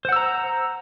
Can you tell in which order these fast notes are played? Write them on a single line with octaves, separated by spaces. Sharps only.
C5 F#5 E6 A#5